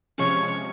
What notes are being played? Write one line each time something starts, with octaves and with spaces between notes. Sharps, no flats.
C3 F3 G#3 C#4 C#5